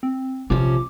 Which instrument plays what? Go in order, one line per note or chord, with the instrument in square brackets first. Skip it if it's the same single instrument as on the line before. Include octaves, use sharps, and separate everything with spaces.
[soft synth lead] C4
[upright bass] A#1 F4 [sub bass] C3 [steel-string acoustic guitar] F3 C#4 [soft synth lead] D6